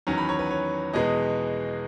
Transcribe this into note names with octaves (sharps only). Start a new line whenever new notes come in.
E2 D#3 F#3 C#4 A#5
B5
C#5
B4
C#5
E2 B2 G#3 B3 D#5